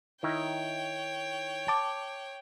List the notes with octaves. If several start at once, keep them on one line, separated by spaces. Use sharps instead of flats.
D#3 D#4 E4 C#5 G5
A5 D6